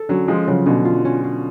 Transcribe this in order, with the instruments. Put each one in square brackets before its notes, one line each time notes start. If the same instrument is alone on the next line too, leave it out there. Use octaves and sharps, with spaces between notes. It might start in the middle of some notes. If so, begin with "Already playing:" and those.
Already playing: [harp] A4
[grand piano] D3 F#3 [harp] C#4
[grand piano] F3 G#3 [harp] F4
[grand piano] C#3 F3 [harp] F#3
[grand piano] B2 D3 [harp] C#4
[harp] F4
C#4
F4